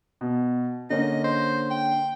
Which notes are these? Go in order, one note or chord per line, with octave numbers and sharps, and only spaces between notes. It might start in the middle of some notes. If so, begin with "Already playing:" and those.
B2
D3 A#3 C#4 D#5
C5
G5